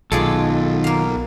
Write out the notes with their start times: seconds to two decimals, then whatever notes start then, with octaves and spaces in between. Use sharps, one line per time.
0.12 B1 D#3 G#3 F4 G#4 A4 D5
0.84 A#3 F5